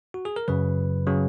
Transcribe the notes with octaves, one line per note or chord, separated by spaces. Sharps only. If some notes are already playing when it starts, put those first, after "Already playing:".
F#4
G#4
A#4
F#2 C#3 F#3 B4
C#3 F#3